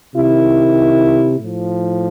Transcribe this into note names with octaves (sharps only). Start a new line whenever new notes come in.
C3 D#3 E4
A2 F3